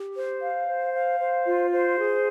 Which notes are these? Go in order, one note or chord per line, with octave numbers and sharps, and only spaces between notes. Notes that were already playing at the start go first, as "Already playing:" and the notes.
Already playing: G4
C5
F5
C5
F5
C5
F4
C5
G#4